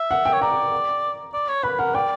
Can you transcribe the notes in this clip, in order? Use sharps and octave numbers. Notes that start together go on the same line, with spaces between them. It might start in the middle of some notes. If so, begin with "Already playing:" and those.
Already playing: E5
F#5
G5
C#5
D5 A#5
D5
C#5
B4 B5
A#4 F#5
D5 G5